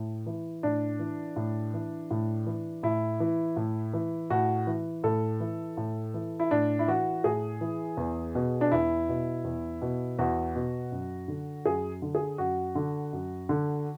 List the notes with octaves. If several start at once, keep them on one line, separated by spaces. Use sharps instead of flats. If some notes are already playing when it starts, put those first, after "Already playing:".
Already playing: A2
E3
A2 D4
E3
A2
E3
A2
E3
A2 E4
E3
A2
E3
A2 F#4
E3
A2 A4
E3
A2
E3
E4
A2 D4
E4
E3 F#4
A2 G#4
E3
E2
B2
D4
E2 E4
B2
E2
B2
E2 F#4
B2
F#2
D3
F#2 G#4
D3
G#4
F#2 F#4
D3
F#2
D3